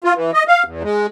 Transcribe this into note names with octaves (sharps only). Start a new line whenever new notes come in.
F4
E3
D#5
F5
E2
G#3